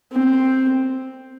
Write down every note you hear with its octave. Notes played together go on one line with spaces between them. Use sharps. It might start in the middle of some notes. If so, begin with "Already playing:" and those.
C4